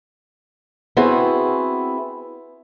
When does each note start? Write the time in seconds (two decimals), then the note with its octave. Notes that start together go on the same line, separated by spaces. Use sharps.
0.97 B3 C4 E4 F#4 G#4